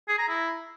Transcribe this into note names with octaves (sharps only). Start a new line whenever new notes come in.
G#4
A#5
E4